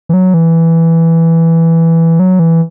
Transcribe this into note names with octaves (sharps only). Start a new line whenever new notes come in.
E3
F#3
E3
F#3
E3